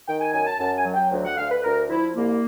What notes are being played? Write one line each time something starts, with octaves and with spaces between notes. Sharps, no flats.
D#3 G5
G#5
F#2 G#5
A5
F#2 A5
G#5
F#3
G5
D2
F#5
D2 F5
B4
D2 A#4
F3 E4
C2 A#3